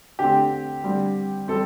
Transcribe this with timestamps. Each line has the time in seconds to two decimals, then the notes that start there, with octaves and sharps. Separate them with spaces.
0.19 D3 A3 C4 G4
0.84 D3 G3 C4
1.48 G3 C4 A4